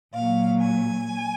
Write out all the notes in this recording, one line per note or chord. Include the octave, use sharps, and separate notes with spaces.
A#2 F#3 F5
G#5